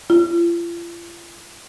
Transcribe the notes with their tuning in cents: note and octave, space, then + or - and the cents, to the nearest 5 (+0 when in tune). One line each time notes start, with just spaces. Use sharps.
F4 -40